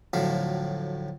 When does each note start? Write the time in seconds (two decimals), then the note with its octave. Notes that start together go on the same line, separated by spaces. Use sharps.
0.13 D2 A2 F3 F#3 E5 F5